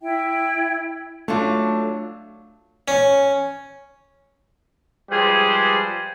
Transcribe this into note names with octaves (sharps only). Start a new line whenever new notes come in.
E4 E5 G5
F#3 A3 D4 F4
C#4
F3 G3 G#3 G#4 B4 C5